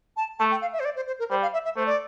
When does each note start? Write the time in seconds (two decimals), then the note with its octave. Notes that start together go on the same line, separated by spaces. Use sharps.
0.17 A5
0.39 A3 A5
0.51 G5
0.62 F5
0.73 E5
0.80 C5
0.85 D5
0.96 C5
1.07 C5
1.19 A#4
1.31 G3 C5
1.42 F5
1.53 E5
1.65 E5
1.76 A3 C5
1.86 D5